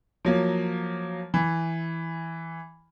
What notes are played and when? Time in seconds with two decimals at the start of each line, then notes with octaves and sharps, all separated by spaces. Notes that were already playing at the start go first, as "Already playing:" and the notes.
0.25 F3 F#3 A#3
1.34 E3